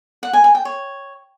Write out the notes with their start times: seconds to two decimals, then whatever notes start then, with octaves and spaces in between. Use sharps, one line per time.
0.23 F#5
0.33 G#5
0.44 G#5
0.55 G5
0.65 C#5